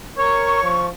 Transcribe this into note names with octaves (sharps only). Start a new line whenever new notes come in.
A#4 C#5 C#6
F3